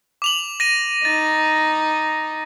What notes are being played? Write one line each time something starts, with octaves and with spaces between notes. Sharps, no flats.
D6 F7 F#7
A#6 D#7
D#4 A6